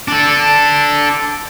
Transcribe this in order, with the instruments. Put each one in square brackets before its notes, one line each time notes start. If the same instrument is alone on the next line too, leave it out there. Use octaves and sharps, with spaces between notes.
[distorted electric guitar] D4 A4